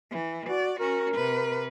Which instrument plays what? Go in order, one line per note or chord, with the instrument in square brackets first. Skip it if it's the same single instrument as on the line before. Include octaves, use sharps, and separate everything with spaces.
[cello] E3
[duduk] F#4 [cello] D5
[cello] C#4 F#4 [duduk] A#4
[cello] C3 B4